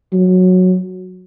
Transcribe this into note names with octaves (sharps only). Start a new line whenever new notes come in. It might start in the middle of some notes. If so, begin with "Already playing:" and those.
F#3